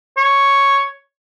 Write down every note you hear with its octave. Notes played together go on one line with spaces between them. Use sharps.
C#5